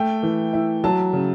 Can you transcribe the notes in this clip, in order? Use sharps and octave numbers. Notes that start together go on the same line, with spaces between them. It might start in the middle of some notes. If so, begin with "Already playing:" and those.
Already playing: A3 G5
E3
E4
F#3 A5
C#3